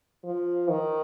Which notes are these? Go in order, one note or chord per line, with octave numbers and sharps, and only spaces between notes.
F3
D#3